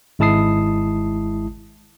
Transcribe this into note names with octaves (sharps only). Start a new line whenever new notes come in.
G#1 G#3 E4 A5 D#6 C7